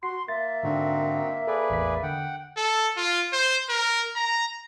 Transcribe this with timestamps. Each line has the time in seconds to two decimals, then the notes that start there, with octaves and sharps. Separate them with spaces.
0.03 F#4 C6 C7
0.28 A#3 E5 A6
0.63 G#2 D3 C4 D4 D#4 F#4
1.47 G#4 A4 B4 D5
1.70 A1 E2 B6
2.03 D3 F#5 G5
2.57 A4
2.97 F4
3.33 C5
3.69 A#4
4.16 A#5